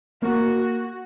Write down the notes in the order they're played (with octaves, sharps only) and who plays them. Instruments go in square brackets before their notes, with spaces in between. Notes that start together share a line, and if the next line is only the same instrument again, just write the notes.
[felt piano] A#3 [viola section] F#4